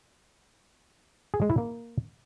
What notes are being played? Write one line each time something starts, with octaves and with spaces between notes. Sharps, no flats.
G#4
G#3
E4
A#3